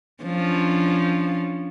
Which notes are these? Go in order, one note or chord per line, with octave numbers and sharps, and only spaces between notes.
F3 C#4 D4